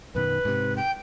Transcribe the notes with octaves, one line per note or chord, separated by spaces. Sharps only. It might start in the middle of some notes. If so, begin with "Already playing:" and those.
F#2 B2 D#3 B4
G#2 C3
G5